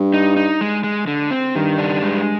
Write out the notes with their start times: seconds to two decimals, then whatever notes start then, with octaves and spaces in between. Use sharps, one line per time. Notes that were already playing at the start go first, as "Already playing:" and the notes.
Already playing: G2
0.14 D#4
0.37 D#4
0.61 G#3
0.84 G#3
1.07 D3
1.31 C4
1.55 G2 D#3
1.78 D4
2.02 G#3